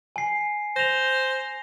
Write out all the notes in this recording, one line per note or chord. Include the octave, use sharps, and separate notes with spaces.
G#5 C7
C5 A#6 F7